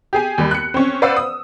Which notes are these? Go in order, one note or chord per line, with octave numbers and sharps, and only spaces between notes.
G4 G#4 G#5
D#2 G3
F#6 C#7
C4 C#4
B4 C5 D5 F5 F#5 E6
D#6